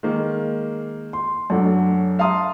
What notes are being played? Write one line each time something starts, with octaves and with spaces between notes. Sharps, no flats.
D#3 G#3 A#3
C6
F#2 F#3 A3 D4
E5 F5 A5 A#5 C6 D#6